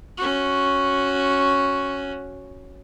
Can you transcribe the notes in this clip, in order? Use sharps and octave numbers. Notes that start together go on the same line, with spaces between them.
C#4 F#4